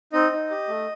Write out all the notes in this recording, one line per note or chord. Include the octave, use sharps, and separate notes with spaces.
C4 D#4 D#5
D#4
G4
A3